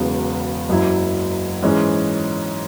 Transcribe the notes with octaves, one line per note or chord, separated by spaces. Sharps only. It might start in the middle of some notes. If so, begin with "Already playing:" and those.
Already playing: E1 E2 C#3 F#3 B3
F#1 F#2 F#3 E4
G#2 E3 G#3 C#4